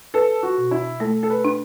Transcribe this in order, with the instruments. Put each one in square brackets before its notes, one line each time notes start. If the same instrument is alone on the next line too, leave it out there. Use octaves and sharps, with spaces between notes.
[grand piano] A4 [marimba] B4
[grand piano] F#4
[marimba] B2
[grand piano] E4
[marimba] A3 [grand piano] A4
[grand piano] A4
B4
[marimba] D4